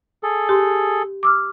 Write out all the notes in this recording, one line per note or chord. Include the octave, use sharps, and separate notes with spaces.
G#4 A4
G4 C6
D6 E6 F6